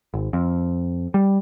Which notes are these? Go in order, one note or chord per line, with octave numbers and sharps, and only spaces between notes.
G#1
F2
G3